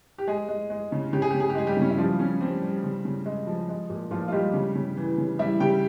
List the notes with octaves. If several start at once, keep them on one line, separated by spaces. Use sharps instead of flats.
G4
G#3 G#4
G#3
G#3
C#3
C#3 G4
G#4
C#3 G4
G#4
G4
G#3 G#4
G3 G4
C#3
C#4
E4
F3 G3 F4
G3 C#4
G3 C4
G3
C#3
C#3
G#3
F3
G#3
A#2
A#2 F3 F4
F4
G3 G#3 G4
C#3
C#3
E3
C#3
G3 E4 E5
C#3 G4 G5